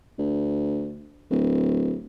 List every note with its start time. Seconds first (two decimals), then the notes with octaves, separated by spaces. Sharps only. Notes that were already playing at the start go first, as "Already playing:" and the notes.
0.18 D2
1.31 D1